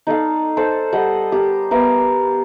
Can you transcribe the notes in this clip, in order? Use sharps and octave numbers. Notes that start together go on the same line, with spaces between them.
D#4 A4 D5 F5
A4 C5 D5 G5
G3 A4 D#5 F#5
G4 A#4
B3 A#4 E5 F5